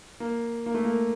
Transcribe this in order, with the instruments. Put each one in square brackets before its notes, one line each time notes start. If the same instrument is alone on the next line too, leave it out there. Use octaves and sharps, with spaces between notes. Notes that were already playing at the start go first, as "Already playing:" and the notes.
[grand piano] A#3
A#3
A3
A#3